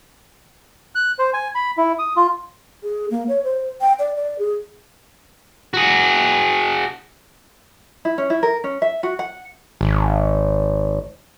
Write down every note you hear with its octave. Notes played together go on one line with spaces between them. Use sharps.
F#6
C5
G#5
B5
E4
D#6
F4
G#4
A#3
C#5
C5
G5
D5
D5
G#4
F#4 G#4
E4
C#4
E4
A#4
C#4
E5
F#4
F#5
G#1